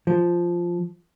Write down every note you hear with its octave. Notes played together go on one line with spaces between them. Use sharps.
F3